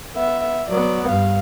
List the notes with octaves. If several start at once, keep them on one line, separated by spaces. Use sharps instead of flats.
B3 E5
F#3 B3 D5
G2 F5